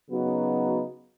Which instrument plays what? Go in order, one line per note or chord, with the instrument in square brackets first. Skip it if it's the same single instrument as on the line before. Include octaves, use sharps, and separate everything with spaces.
[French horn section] C#3 F#3 B3 D#4 F#4